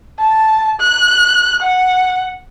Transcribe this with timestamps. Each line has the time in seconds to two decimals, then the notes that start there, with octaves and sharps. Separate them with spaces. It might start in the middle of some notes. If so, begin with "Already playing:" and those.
0.19 A5
0.80 F#6
1.62 F#5